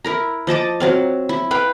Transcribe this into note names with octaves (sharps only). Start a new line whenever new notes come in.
E4 A#4 A#5
F3 D#5 A5 D6
F#3 C4 F5
E4
B4 F5 G5